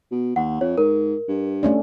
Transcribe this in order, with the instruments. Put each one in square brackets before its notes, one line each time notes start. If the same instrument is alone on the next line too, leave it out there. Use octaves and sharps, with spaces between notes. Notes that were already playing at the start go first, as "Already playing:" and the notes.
[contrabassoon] B2
[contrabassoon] D#2 [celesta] F#5
[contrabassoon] F2 [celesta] C#5
[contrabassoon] G#2 [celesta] A#4
[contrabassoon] G2
[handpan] A3 C#4 D4